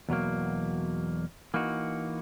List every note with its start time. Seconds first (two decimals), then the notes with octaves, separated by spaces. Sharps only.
0.09 E2 B2 F#3 A#3
1.54 E3 A#3 D#4 F#4